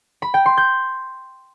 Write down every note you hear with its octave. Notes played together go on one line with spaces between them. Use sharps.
B5
G5
C6
G6